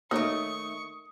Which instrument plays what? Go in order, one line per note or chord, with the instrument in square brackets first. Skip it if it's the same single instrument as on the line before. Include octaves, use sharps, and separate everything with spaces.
[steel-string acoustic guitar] D#3 A3 [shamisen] A#3 D#4 C#5 [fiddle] C#6 [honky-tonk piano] D#6